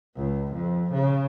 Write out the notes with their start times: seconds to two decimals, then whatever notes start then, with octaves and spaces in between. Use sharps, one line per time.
0.17 C#2
0.53 F2
0.93 C#3